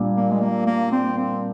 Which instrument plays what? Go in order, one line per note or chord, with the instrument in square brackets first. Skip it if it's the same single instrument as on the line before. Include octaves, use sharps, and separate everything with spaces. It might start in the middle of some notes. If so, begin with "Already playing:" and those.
Already playing: [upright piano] A#2 G3 D4
[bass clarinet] A#3
G#3
A#3
A#3
C4
C4